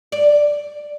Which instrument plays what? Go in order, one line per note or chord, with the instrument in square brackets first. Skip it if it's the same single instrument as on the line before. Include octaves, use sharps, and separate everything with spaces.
[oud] D5